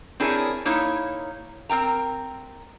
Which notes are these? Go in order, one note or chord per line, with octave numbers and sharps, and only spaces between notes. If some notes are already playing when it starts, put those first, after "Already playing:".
C4 D4 E4 G#4 A#4 C#5
A#3 D#4 E4 C#5
C4 A#4 G5 A#5